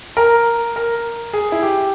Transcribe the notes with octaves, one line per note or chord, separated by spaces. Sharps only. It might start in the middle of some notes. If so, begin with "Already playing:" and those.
A#4
A#4
G#4
E4
G4